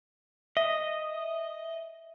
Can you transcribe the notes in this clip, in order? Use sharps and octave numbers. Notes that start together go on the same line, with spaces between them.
D#5 E5